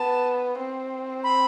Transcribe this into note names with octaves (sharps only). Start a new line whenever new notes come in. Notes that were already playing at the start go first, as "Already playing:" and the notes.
Already playing: B3 A5
C4
B5